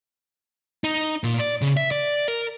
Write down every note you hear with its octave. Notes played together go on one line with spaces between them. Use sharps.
D#4
A#2
D5
C#3
E5
D5
A#4